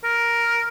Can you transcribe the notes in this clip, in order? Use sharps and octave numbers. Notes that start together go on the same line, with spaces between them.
A#4